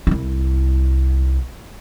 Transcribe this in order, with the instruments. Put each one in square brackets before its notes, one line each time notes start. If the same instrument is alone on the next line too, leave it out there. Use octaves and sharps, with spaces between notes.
[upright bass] C2 E4